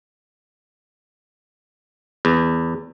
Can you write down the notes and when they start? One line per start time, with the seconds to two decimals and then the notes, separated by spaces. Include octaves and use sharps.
2.25 E2